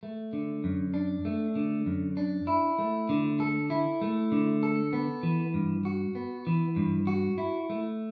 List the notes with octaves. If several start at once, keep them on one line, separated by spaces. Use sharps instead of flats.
A3
D3
F#2
D4
A3
D3
F#2
D4
E4
A3
D3
A4
E4
A3
D3
A4
B3
E3
G2
F#4
B3
E3
G2
F#4
E4
A3